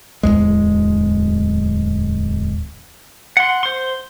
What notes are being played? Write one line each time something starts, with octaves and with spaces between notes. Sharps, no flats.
D1 G1 E2 G#3
F#5 C6
C5 C6